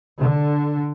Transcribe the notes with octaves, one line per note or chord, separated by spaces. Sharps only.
D3